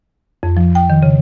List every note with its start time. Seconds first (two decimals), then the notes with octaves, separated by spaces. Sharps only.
0.43 F2
0.57 F3
0.75 G5
0.90 D#3
1.03 C#3